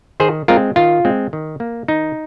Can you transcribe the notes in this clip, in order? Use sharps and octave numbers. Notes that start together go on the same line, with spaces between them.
D#3 G#4 C5
G#3 C4 F4 A#4
D#3 F4
G#3 C4
D#3
A#3
D#3 D#4